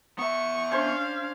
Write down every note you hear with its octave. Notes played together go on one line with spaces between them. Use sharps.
B3 E5 C#6
C#4 D4 C5 F5 C6